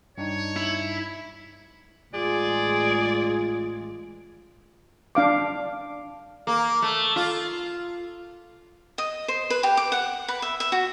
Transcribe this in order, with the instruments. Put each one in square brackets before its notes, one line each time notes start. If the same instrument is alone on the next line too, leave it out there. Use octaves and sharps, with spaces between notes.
[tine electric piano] G2 D4 D#4 [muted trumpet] C#5
[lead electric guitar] E4
[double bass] A1 G#3 [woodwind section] F4 [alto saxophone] G#4 [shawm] D5
[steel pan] D4 F5 D6
[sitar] A#3
A3
F4
[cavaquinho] D#5
C5
B4
G4
D6
F#5
B4
E5
E5
F#4